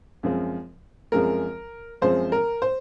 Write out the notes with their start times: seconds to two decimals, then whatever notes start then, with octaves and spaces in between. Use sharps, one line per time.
0.23 F#2 F3 G#3 C4
1.12 F#2 F3 G#3 C4 A#4
2.02 F#2 F3 G#3 C4 C5
2.32 A#4
2.62 C5